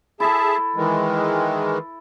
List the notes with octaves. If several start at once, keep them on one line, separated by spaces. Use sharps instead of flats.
E4 G#4 A4 E5 A5
D#3 E3 G#3